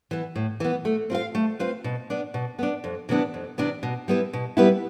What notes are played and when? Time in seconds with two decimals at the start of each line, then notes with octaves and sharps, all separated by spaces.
0.11 E3 B3
0.36 A2
0.60 E3 B3
0.85 A3
1.10 C4 F4 B4 F5
1.35 A3
1.59 C4 F4 B4 F5
1.84 B2
2.10 B3 D4
2.34 B2
2.59 B3 D4
2.84 F2
3.09 C3 E3 B3 D4
3.34 F2
3.58 C3 E3 B3 D4
3.83 B2
4.08 G3 B3 E4 B4
4.33 B2
4.57 G3 B3 E4 B4